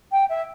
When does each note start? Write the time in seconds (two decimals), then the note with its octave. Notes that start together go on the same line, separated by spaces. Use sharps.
0.12 G5
0.29 E5